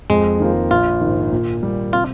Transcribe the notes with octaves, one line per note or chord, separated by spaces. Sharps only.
F2 G#3
D#3 A#3 F4 C5
A#1 F4
G#2 D#3
A#2
G3 A#3
C3 F4